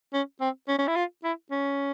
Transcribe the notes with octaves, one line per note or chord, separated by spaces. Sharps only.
C#4
C4
C#4
C#4
E4
F4
E4
C#4